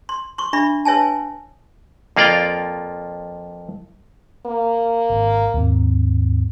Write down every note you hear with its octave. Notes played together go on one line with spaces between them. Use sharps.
C6
C6 C#6
D4 E5 B5 C#6
B4 C#5 E5 G#5 A5
F2 A#3 F4 D5 F5 G5
A#3
G#1
D#2 G#2 C4